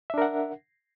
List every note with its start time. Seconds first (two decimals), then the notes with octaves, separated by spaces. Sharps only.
0.10 E5
0.14 D4
0.18 A#4
0.22 F#5